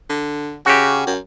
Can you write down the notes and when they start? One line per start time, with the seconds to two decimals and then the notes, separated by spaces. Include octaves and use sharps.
0.10 D3
0.66 C#3 F#4 G4
1.07 F#2